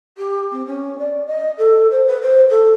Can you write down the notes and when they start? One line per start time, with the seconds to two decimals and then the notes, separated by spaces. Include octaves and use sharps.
0.17 G4
0.51 C4
0.66 C#4
0.98 D5
1.26 D#5
1.57 A4
1.90 C5
2.07 B4
2.22 C5
2.49 A4